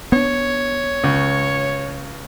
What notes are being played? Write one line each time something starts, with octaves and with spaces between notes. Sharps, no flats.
B3 D4 C#5
C#2